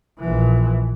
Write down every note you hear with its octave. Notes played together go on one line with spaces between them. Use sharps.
A#1 E3